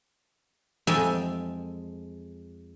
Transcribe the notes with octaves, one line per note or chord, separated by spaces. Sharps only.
F2 G#3 A4 E5 G5 G#5